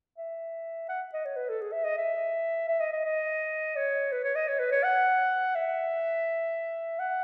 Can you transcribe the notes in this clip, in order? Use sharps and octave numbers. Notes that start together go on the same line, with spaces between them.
E5
F#5
D#5
C#5
B4
A4
G#4
E5
D#5
E5
E5
D#5
D#5
D#5
C#5
B4
C#5
D#5
C#5
B4
C#5
F#5
E5
F#5